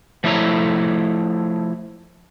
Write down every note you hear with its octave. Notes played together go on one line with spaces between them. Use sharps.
F3 A3 E4 C#5 A#5